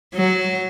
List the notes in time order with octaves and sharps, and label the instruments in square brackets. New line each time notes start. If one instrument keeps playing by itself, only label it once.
[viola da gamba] F#3